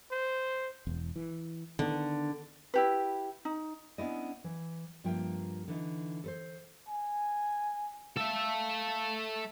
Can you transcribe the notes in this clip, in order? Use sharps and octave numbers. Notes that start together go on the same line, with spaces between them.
C5
E1 E2
E3
D3 D#3 B3
E4 G4 B4
D#4
B3 C#4 D4 E4 D5 D#5
E3
G2 F3 A#3 F4 E5 G5
D3 E3 D#4
A4 B4 C5
G#5
A4 E5 F5